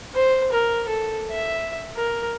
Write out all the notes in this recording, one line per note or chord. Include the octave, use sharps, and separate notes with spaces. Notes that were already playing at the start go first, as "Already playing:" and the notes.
C5
A#4
A4
E5
A#4